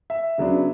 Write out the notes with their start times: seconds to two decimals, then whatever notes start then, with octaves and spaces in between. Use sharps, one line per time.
0.10 E5
0.38 C#3 F#3 B3 D4